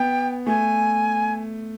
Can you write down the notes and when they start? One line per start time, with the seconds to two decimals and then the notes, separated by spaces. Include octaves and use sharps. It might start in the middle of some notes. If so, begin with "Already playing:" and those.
Already playing: B3 G5
0.47 A3 G#5